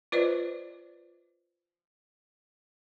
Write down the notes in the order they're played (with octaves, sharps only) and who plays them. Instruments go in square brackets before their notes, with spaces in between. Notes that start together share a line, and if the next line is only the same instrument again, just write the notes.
[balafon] F4 B4 C5 D5 D#5